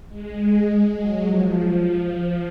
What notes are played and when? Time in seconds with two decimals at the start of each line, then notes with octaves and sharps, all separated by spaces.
0.08 G#3
0.66 G#3
0.95 F#3
1.24 F3